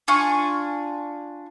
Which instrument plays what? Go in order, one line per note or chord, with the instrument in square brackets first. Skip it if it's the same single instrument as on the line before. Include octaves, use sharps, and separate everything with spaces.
[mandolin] D4 F4 G#5 C#6